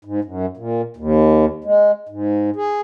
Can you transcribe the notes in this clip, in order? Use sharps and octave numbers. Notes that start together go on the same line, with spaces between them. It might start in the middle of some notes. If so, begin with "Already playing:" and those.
G#2
F#2
A#2
D#2
G#3
G#2
G#4